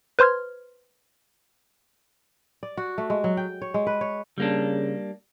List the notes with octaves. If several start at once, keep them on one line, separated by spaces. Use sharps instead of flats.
B4 C5 C6 F6 G#6
D5
F#4
A3
G#3
F#3
G5
C#5
G#3
B4
C#5
C#3 G3 A#3 D4